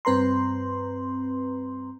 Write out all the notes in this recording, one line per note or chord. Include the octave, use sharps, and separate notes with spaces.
G2 C4 B4 A#5 C6